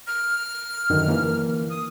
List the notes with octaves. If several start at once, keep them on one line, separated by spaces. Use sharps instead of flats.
F6
F#2 D3 D#3
E3 A#3
D#6